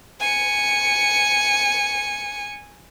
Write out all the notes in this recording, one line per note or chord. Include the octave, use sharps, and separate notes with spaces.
G#5 C#7